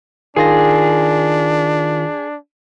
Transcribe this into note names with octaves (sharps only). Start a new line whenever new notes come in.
D#3 D4 F4 G#4 A#6